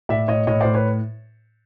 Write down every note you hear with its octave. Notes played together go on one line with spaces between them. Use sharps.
A2 D5 E5
A2 C#5 D#5
A2 C#5 D#5
A2 C5 D5
B4 C#5